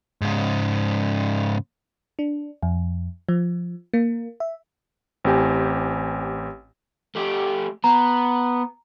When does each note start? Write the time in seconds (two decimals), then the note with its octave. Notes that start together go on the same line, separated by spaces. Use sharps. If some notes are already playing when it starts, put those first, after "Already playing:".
0.21 G#2 C#3
2.19 D4
2.63 F2
3.29 F3
3.94 A#3
4.40 E5
5.24 A1 C4 G4 G#5
7.15 A3 G4
7.84 B3 A#5